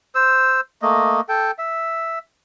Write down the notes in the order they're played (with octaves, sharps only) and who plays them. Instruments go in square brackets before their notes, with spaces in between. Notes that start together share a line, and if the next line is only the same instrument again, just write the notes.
[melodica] C5 E6
A3 A#3 D#5
A4 G5
E5